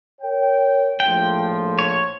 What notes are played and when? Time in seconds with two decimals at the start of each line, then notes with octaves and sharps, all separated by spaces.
0.21 A#4 C#5 G5
1.00 A#1 A2 F3 G5
1.79 C#5